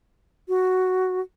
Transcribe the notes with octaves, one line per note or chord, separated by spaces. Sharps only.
F#4